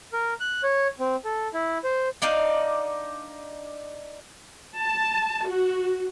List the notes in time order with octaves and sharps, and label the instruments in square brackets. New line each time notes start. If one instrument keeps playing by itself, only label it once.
[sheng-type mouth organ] A#4
F#6
C#5
C4
A4
E4
C5
[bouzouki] D4 D#4 D5 F5
[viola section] A5
F#4